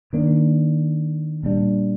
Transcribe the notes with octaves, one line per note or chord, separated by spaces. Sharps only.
D#3 A#3 D4
A#2 G3 D4